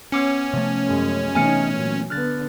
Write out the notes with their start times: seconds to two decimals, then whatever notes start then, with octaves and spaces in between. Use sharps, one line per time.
0.12 B3 C#4 D6 C#7
0.53 C3 F3 A3
0.86 F#2 G#3
1.35 C3 E3 A3 B3 D#4 G#5 F6 C#7
1.73 A#2 F#3
2.10 D3 B3 F6 F#6 A6